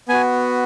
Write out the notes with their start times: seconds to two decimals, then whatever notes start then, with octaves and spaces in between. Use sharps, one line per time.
0.09 B3 F#4 G#5